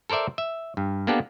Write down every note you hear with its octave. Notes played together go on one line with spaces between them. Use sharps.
A4 A#4 C5 D5 E5
E5
G2
A#3 B3 D4 G4 A4